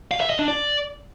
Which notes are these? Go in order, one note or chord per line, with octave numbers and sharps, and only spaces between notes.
F5
E5
D#5
D4
D5